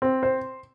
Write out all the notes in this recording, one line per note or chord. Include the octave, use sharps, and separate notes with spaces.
C4
C5